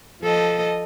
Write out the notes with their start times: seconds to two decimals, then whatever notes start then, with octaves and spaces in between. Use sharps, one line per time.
0.21 F3 A4 D#5